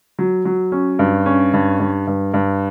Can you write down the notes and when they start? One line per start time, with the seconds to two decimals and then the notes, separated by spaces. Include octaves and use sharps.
0.19 F#3
0.45 F#3
0.72 C#4
0.99 G2
1.26 C#4
1.54 G2
1.80 G2
2.07 G2
2.34 G2